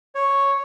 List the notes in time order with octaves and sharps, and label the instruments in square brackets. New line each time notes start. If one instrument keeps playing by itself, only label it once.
[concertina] C#5